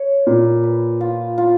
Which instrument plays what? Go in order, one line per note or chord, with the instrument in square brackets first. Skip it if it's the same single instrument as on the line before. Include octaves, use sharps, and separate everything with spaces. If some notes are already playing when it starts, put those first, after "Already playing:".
Already playing: [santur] C#5
[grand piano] A#2 [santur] B4
[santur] B4
F4
F4